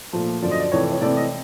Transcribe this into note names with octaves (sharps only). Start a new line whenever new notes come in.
A#2 F3 A3
F#2 D3 F3 D5
D#5
D5
F2 C3 E3 A3 C#5
C#5
C3 E3 A3 D5
D#5